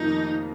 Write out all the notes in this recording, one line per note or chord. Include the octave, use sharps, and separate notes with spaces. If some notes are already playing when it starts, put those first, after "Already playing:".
Already playing: F1 F2 D#3 A#3 D#4 F4